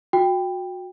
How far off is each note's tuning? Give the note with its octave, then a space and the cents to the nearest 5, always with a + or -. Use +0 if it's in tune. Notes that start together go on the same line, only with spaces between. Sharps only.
F#4 -25 G5 +10